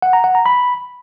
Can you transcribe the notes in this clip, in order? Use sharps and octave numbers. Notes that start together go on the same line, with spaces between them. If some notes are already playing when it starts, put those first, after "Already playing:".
F#5
A#5
F#5
A#5
B5